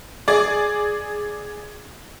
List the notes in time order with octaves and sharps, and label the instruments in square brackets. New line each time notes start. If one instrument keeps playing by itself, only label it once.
[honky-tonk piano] G#4 D5